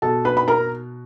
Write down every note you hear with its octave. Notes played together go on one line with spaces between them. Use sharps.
B2 A4 A5
B4 B5
B5
A#4 A#5